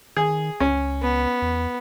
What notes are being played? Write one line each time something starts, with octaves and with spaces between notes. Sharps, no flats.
D#3 G#4
C#2 C#4
B3
E2